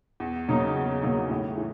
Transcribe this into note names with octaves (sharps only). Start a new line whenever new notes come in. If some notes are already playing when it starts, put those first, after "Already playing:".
E2
C#3 F#3 A#3 D#4
E2
C#3 F#3 A#3 D#4
A2
E3